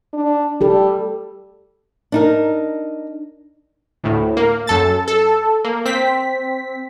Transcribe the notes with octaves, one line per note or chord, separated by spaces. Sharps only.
D4
G3 G4 A4
D4 D#4 A#4
D2 A2
A#3
F#2 A4 A6
A4
A#3
C4 B6